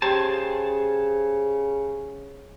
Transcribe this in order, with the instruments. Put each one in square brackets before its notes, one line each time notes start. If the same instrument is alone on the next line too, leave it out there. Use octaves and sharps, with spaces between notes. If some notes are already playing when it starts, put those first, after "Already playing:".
[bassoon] C#3 [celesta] G4 G5 [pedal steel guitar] G#4 C5 A5